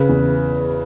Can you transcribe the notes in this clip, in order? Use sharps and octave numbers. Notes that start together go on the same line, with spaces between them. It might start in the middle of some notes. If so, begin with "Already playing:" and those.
Already playing: C#3 B4
E2